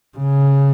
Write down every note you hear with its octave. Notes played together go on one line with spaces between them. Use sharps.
C#3